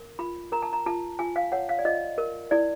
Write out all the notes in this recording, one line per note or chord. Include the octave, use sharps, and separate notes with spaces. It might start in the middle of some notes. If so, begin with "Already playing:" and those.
Already playing: A#4
F4 B5
A#4 A#5
A5
A#5
F4 A5
F4 G#5
F5
C#5 F#5
F5
D5
F4 D#5
A#4
E4 D5